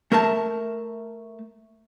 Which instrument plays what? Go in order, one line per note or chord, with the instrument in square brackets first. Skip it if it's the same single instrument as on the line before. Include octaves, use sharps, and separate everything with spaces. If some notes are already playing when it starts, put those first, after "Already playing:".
[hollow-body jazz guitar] A3 A#4 E5 A5